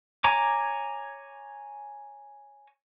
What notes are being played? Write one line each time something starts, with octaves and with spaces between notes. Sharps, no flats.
C#5 G#5 A#5 D6